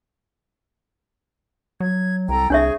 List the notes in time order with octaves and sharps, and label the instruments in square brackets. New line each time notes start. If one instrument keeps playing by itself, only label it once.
[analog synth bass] F#3 [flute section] G#6
[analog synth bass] C2 [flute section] A4 G5 A#5
[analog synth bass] C2 [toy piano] D4 C#5 E5 [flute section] G#4 C#6